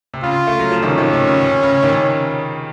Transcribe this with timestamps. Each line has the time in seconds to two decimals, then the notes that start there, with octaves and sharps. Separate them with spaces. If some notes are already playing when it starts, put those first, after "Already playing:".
0.14 C3
0.23 C#3 F4
0.47 A3
0.60 F#3
0.72 F3
0.82 C3 D#3 C#4
0.98 C3 D#3
1.13 C3
1.27 C#3
1.43 C3
1.63 C#3
1.83 C3 D#3